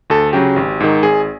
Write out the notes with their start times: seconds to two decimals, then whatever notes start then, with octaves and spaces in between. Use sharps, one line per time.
0.10 D2 A4
0.33 C#3 F#3 G4
0.56 G#1
0.80 G#2 D#3
1.03 G#1 G#4